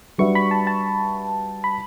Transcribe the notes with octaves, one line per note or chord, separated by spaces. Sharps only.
G3 D4 F#4 B4 E5 C#6
B5
A5
A5
B5